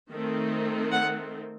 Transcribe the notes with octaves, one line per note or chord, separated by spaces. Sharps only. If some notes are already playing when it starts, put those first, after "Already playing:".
D#3 A3 C4
F#5